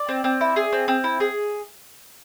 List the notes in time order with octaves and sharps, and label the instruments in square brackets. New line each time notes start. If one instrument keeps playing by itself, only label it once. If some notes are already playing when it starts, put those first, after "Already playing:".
Already playing: [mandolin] D5
C4
C4
E4
G#4
C4
C4
E4
G#4